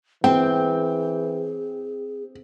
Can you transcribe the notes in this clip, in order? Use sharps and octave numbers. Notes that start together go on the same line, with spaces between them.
E3 C4 G#4 G5